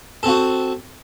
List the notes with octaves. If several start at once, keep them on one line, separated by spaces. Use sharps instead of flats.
C4 F#4 A4